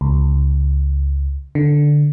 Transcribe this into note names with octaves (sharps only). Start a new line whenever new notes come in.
C#2
D3